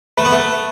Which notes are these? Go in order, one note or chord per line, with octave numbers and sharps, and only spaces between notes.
A3 B4
B3
A3
B4